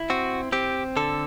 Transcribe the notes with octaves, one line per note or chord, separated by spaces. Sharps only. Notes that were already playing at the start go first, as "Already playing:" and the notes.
Already playing: E4
C4 F#4
C4 G4
D3 A4